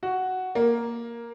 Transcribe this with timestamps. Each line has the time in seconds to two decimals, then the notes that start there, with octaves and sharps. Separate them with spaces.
0.03 F#4
0.55 A#3